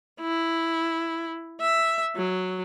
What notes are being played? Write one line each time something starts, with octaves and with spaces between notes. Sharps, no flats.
E4
E5
F#3